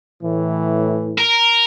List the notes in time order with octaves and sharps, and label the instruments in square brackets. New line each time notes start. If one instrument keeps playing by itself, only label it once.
[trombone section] A2 E3
[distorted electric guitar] A#4